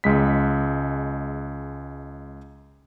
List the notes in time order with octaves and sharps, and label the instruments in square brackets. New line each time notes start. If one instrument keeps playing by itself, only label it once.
[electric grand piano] C#2 G#3 B6